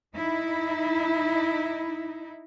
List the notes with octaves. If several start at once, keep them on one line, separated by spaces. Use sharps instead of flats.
D#4 E4